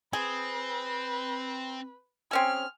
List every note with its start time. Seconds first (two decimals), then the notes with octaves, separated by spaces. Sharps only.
0.13 C4 G#4 B4
2.31 C4 C#4 G#4 F6